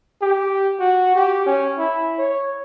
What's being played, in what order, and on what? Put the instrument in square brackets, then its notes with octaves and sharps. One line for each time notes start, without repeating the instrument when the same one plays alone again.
[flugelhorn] G4
F#4
G4
C#4
E4
C#5